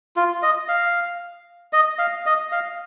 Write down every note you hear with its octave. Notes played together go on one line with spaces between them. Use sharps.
F4
D#5
F5
D#5
F5
D#5
F5